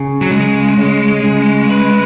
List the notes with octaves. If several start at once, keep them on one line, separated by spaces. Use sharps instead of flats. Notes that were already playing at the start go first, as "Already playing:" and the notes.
Already playing: C#3
F#3
C#3 G#3
C#3
C#3
B4